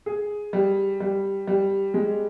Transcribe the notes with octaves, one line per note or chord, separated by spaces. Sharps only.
G#4
G3
G3
G3
G#3